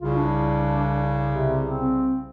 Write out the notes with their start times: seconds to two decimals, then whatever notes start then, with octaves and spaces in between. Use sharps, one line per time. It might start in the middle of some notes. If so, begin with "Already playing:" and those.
0.01 C2 C#3 F4
0.16 D4
1.30 C3
1.68 C4